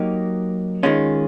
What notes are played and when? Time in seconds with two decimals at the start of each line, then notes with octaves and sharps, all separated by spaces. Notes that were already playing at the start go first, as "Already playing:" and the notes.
Already playing: F#3 A#3 D#4 G4
0.83 D#3 G#3 C#4 F4